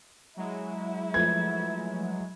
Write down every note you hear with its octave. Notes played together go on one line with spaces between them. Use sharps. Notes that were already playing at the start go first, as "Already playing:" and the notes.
F#3 G#3 E4
F3 A3 B4 G#6